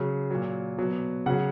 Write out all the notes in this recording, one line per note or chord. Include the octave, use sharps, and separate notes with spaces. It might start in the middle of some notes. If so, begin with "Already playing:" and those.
Already playing: C#3 F#3
A#2 F#3
B2 F#3
C#3 F#3 F#5